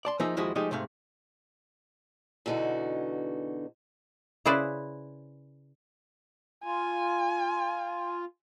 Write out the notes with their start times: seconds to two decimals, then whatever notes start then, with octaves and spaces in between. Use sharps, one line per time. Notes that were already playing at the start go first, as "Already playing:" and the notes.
0.05 D5 A5 C6
0.20 F3 A#3 D#4 G#4 E5
0.37 D#2 F3 G#3 E4 F#4
0.55 F3 G#3 A3 D#4 G4 G#4
0.71 G#2 C3 A3 F5
2.46 E2 B2 D3 D#4 F#4
4.46 C#3 E4 G#4 B4 C5 D5
6.64 F4 G#5